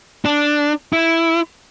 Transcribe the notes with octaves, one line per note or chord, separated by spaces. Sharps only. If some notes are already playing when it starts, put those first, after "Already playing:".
D4
E4